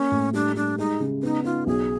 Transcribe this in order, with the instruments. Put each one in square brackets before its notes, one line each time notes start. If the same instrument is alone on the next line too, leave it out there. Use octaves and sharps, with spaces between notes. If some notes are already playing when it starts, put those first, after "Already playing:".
Already playing: [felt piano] A#3 [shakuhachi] C#4
[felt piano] A2
[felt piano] G3 [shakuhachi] D4
[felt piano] G3 [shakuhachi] D4
[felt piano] G#3 [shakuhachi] D#4
[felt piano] C#3
[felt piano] B3 [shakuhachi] D#4
[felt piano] D#4 [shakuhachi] F4
[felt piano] B1 [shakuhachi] G#4